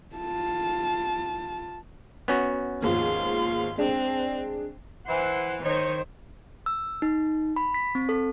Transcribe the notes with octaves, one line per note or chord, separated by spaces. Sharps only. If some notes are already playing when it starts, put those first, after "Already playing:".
F4 A5
B3 C#4 F#4
D#2 G#2 F3 F5 C6
G#3 C4 D4
E3 C5 F#5
D#3 D#4 C5 C#5
E6
D#4
B5
B6
C4
A4